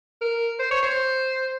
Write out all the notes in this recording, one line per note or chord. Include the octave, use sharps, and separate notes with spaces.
A#4
C5
C#5
C5